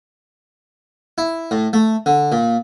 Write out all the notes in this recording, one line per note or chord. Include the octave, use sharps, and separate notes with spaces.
E4
A2
A3
D3
A#2